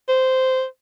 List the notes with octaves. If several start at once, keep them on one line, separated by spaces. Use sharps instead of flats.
C5